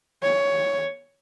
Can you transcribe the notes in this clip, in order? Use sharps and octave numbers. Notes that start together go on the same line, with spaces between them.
C#5